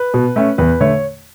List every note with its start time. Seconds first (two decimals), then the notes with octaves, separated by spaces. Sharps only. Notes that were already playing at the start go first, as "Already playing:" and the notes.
Already playing: B4
0.14 B2
0.36 A3 C#4
0.58 E2 B4
0.80 D3 A3 C#5